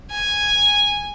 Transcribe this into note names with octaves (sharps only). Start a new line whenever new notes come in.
G#5